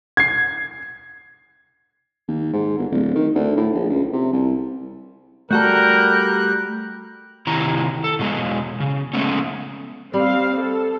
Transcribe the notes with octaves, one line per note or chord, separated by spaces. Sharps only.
G#6 C7
D#2
G#2
G1
D1
D#3
D2
A2
A#1
C#2
C3
C2
G3 A3 F#4 A4 A#4 F#6 G6
C3 D#3 E4 C#5 A#5
A4
B2 F3 F#3 G#3 B3
C#3
G#3 A3 B3 C#4
G3 C4 F5
A4